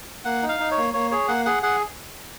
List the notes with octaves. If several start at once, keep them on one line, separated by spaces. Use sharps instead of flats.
A#3 F#5
D#4
F5
D#4
C#5
A#3
A#3 C#5
G#4 C#5
A#3 F#5
G#4 F#5
G#4 F#5